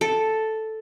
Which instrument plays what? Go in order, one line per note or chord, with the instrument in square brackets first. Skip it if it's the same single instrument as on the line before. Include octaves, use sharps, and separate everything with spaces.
[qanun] A4